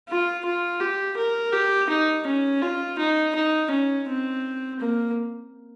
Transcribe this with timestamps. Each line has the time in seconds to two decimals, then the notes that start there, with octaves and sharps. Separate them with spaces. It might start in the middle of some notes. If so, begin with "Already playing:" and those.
0.08 F4
0.45 F4
0.80 G4
1.17 A#4
1.53 G4
1.90 D#4
2.26 C#4
2.62 F4
2.98 D#4
3.35 D#4
3.71 C#4
4.08 C4
4.80 A#3